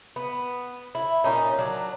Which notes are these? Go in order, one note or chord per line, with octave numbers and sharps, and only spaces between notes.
B3
E4
A#2 C#4 D#4
F#3 D4